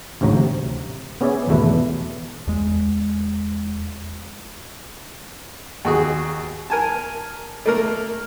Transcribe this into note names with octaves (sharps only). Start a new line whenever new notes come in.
A1 D2 G#2 F#3 A#5
C3
B3 C#4 G#4 D5 E5 G#5
G#1 E2 B2 A3 E4 B4
E2 G#3
D#2 F#4 G#4
A#4 G#5 A5
A3 A#3 A#4